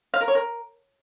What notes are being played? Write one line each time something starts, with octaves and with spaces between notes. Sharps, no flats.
F5
A#4
C#5
A#4